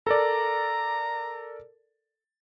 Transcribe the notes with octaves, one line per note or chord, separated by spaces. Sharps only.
A4 A#4 D5 A#5